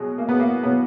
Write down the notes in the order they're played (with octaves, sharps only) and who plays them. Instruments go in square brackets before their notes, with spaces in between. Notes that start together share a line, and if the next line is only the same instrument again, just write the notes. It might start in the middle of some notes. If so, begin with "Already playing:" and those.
Already playing: [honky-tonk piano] B2 F#3 G#3
A#3
B3
A#3
B2 F#3 B3